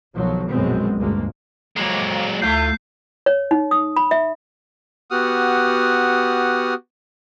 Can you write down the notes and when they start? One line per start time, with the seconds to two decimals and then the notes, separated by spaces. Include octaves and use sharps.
0.15 B1 B2 D#3 F3 F#3
0.49 A#1 F#2 B2 G#3 B3 C4
0.97 D2 G2 A#2 G#3 A#3
1.77 F2 F#3 G#3 A#3
2.42 D2 A3 E4 F4 G6 C7
3.26 C#5
3.51 D#4
3.71 D#6
3.96 B5
4.11 E5
5.11 B3 F#4 G4 F#5 D#6 F6